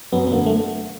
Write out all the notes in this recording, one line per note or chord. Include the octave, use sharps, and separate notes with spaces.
F#2 B3
B3
D3 A#3
A3